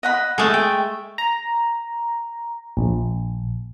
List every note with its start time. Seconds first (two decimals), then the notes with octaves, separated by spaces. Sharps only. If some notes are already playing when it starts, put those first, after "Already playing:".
0.03 D#5 F#5 B5
0.38 G#3 A3 A4 D#6
0.54 G5
1.18 A#5
2.77 A#1